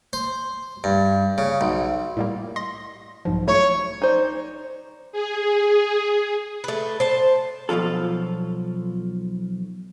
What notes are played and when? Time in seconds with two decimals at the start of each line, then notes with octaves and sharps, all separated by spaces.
0.13 C5
0.84 G2
1.38 C#3
1.61 B1
2.17 A2 G3 A#3
2.56 D#5 C6 A#6
3.25 B1 G#2 F3
3.48 F#3 A3 E4 C#5
4.02 D#4 C5 D5
5.12 G#4
6.64 A3 B4
7.00 C5 A5
7.69 B1 B2 F3 F4 A4